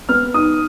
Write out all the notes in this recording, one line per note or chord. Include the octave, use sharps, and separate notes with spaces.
B3 F6
D#4 D#6